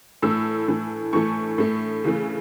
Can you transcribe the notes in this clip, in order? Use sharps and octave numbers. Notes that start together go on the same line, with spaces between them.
A2 E3 A3 E6
A2 E3 A3
A2 E3 A3 C#6
A2 A3
C#3 E3 A3